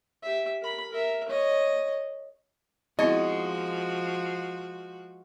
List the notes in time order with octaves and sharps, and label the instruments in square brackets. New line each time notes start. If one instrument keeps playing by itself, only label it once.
[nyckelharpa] G4 E5
A#4 B5
A#4 E5
C#5 D#5
[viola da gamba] F3 F#4 [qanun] G#3 [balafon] B3 C4 E4 [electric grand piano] D#5